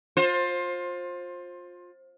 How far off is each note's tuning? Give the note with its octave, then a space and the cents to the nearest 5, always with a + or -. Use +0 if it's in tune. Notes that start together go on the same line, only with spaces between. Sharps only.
F4 +25 C5 +20